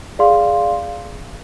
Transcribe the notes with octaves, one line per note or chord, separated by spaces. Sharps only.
G#4 D5 F5 C6